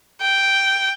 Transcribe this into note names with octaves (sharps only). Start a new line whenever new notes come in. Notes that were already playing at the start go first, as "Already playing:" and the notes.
G5